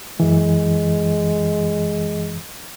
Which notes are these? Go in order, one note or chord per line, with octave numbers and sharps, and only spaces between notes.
F#2 E3 G#3